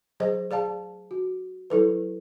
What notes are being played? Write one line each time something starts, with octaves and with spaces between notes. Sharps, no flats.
F#3 G#4 C5 D#5
G#4 D5 F5 A5
F#4
F#3 E4 A4 B4